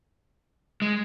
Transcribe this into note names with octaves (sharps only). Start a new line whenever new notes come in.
G#3